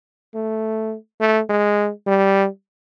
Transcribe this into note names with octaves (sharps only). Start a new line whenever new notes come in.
A3
A3
G#3
G3